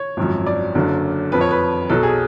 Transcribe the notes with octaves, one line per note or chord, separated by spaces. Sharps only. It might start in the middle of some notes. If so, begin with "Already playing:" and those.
Already playing: C#5
G#1 F#2 F3
D5
F#1 F#2 D3
F2 F3 B4
C#5
B4
B1 B2 F#3 A4
G#4